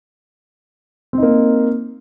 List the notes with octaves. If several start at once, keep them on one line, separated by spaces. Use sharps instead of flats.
A#3 C4 D#4